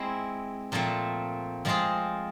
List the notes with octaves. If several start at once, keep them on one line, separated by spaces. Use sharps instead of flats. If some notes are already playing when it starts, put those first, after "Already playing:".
Already playing: G#3 C4 E4
A#2 F3 A3 C4
F3 G#3 C4 F4 G#4